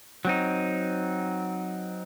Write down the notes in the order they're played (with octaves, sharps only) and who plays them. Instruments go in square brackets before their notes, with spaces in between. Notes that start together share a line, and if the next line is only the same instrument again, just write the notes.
[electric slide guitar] F#3 C4 D#4